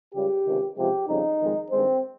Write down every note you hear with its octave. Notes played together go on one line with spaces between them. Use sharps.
C#2 C#3 G3 G4
C#2 C3 D#3
C#2 C3 F3 G#3 G4
F2 C#3 G3 D#4
F2 D#3 G#3
G2 D#3 G#3 C4